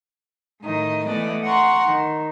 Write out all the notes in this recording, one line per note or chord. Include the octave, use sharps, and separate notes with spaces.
A2 D#3 D#5
E3 A3 B3 D5 D#5
F#5 A#5 C6 C#6
D#3